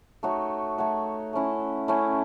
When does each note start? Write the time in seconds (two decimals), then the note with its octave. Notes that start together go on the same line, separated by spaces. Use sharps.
0.23 A3 D#4 F#4 C#5
0.78 A3 D#4 F#4 C#5
1.33 A3 C#4 E4
1.88 A3 C#4 E4